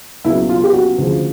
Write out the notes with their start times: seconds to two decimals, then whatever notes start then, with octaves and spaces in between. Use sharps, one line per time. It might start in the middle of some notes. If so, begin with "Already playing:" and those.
0.24 C#2 B2 F#3 E4
0.49 F4
0.64 G4
0.73 F#4
0.98 D2 C#3 F3